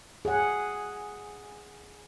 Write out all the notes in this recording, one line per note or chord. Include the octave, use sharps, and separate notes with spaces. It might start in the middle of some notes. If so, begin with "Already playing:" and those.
G#4 F#5